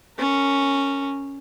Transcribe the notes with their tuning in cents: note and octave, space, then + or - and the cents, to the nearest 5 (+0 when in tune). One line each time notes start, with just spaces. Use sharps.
C#4 +0 A#4 -20